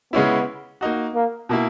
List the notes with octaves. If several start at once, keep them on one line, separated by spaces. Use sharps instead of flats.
C#3 G#3 B3 C#4 E4
A#3 D#4 F#4
A#3
B2 A#3 E4